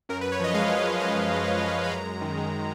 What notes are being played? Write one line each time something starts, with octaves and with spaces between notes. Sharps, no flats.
F#2 A#4
B4
F#2
C#5
F3 D#5
G#3 F5
D#5
F#2 C#5
D#5
F#2
F3 D#5
D#5
G#3
C#5
F#2 D#5
F#2 C#5
D#5
F3
F5
G#3
B5
F#2 A#5
F#2
D#3
G#3